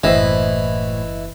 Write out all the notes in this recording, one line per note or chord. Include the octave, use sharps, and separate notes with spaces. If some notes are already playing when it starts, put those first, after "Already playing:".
F#1 A2 E3 C5 D#5 E5